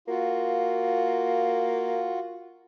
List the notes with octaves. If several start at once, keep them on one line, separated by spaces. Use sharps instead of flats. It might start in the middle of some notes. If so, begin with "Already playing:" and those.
A#3 F4 F#4